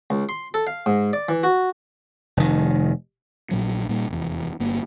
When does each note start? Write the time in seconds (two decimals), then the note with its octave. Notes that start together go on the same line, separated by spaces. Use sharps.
0.10 C#2
0.29 C6
0.54 A4
0.67 F5
0.86 G#2
1.13 D5
1.29 E3
1.43 F#4
2.37 F1 D#3
3.51 A#1 A#2 F#3
3.89 A#2 G3
4.08 F1 E2
4.59 G1 G2 A#3